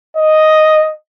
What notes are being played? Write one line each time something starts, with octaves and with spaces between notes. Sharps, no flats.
D#5